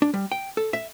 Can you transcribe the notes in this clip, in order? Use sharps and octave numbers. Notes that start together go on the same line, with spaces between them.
D4
G3
G5
A4
E5